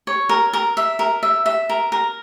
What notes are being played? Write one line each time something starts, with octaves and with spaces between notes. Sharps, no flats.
C#5
A#4
A#4
E5
A#4
E5
E5
A#4
A#4